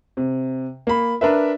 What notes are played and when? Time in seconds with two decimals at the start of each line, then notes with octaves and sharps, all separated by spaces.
0.17 C3
0.87 A#3 B5
1.21 D4 A#4 B4 E5